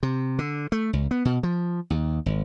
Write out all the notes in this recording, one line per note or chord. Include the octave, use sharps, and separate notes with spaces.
C3
D3
A3
C#2
B3
B2
F3
D#2
G#1